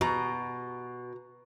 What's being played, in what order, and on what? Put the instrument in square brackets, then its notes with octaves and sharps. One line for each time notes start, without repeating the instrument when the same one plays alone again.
[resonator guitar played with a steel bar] B2 [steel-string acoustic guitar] F#4 A#5